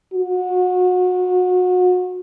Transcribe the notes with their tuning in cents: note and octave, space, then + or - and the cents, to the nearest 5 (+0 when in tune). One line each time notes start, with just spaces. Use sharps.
F#4 -30